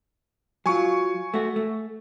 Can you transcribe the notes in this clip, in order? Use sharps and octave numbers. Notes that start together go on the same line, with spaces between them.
F#3 F4 G#5 C#6
A3 F#4
A3